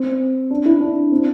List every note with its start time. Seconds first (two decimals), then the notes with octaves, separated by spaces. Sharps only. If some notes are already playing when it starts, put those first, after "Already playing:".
Already playing: C4
0.51 D4
0.65 E4
0.80 D4
1.12 C4